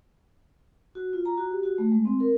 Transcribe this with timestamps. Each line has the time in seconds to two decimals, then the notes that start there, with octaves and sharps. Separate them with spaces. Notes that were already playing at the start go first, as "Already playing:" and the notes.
0.95 F#4
1.13 F4
1.26 A#5
1.37 F#4
1.51 G4
1.63 F#4
1.78 A3
1.92 G#3
2.05 C4
2.20 A#4